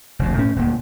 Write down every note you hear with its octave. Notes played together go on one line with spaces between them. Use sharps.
F1 D2 C3
A2 C#4
D#1 D2 A#2